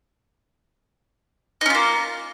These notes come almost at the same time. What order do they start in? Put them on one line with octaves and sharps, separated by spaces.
D#4 C#4 F4 A#3